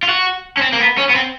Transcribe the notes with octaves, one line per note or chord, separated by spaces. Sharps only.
F4
F#4
C#4
C4
A#3
B3
C#4
B3
C4